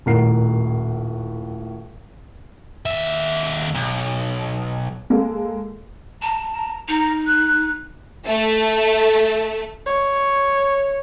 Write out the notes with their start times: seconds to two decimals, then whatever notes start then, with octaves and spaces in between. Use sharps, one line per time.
0.06 D#1 A2 A#4 F#5 C7
2.86 D#2 E5
3.74 B1
5.10 G#3 A#3 A4
6.22 A5 A#5
6.53 A#5
6.89 D#4 A#5
7.27 F#6
8.27 A3
9.86 C#5